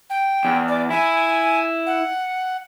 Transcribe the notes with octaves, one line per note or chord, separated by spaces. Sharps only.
G5
E2
D5
E4 G#5
F#5